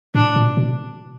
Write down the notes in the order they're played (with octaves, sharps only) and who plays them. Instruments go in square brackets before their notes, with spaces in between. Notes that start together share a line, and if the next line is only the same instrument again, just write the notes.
[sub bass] A2 [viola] D4
[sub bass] A#2
B2